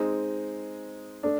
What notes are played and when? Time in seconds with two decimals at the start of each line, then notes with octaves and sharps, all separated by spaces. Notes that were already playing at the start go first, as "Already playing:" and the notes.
Already playing: G#3 C4 D#4
1.23 A3 D4